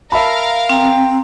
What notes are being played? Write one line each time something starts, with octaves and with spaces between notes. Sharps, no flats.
A#4 E5 F5 A5 B5
C4 G5 A#5